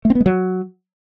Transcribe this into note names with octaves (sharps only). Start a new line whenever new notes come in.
A3
C4
B3
G#3
F#3